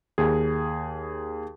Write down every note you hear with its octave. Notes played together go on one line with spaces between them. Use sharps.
D#2 G#4